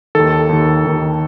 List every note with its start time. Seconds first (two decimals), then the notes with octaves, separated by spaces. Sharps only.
0.15 D#2 D#3 A4
0.49 D#2 D#3
0.85 D#2 D#3